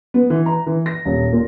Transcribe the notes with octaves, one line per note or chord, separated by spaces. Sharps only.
B3
E3
A#5
E3
A#6
D#1
A#2